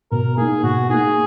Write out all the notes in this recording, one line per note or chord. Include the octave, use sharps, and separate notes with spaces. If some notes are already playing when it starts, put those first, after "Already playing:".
B2 A#4
A#3 D#4 G#4
B2 F#4
A#3 D#4 G#4